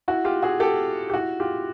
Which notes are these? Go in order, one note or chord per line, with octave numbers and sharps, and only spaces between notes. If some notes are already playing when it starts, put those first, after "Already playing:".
E4 F#4
F4 G4
F#4 G#4
G4 A4
G4
E4 F#4
F4 G4